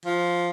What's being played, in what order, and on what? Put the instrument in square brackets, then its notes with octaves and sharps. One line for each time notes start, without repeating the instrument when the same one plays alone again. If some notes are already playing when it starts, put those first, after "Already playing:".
[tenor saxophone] F3